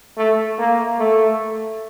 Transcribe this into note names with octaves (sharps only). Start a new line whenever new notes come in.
A3
A#3
A3